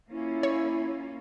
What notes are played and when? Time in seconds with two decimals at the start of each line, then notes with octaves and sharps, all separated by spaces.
0.11 A#3 C#4 E4 F4
0.43 C#5